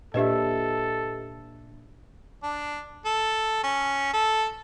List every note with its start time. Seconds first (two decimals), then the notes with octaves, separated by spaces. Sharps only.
0.14 A#2 D4 G4 A4 B4 D#5 E5
2.43 D4
3.06 A4
3.64 C#4
4.14 A4